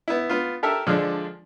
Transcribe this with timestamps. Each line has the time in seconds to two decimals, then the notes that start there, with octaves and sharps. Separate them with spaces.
0.08 B3 E4
0.29 B3 F4
0.63 G4 A4 A#4 E5
0.87 D3 F3 G#3 D4